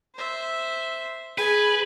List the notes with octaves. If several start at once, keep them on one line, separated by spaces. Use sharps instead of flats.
C5 E5
G#4 B4 G#5